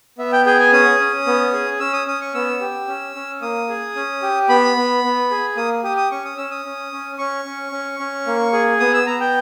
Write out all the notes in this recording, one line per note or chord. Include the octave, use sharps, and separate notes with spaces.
B3 E5
G5
G#4 G5
G#5
C#4 D#6
C#4
B3
G#4
C#4 E6
D#6
C#4 D#6
C#6
B3 E6
G4
C#4
C#4
A#3 D#6
G#4
C#4
G4
B3 B5
B3
B3
G#4
A#3 D#6
G4 D#6
D#6
C#4 C#6
D#6
C#4 E6
D#6
C#4
C#4
C#4 C#6
C#4
C#4
C#4
A#3
G#4
B3 D#6
E6
B3 A#5
G5